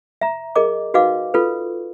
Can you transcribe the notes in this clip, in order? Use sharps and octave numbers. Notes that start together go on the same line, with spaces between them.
E5 A#5
G#4 A#4 D#5 D6
D#4 F#4 B4 D#5 F5 D6
F4 A4 B4